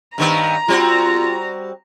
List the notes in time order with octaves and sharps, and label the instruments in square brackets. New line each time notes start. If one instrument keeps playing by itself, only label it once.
[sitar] G2 D#3 B3 [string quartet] A#5
[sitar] G3 C4 F#4 [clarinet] F4